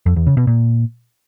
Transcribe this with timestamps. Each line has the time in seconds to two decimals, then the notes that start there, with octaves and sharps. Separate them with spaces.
0.06 F2
0.16 E2
0.27 C#3
0.37 B2
0.47 A#2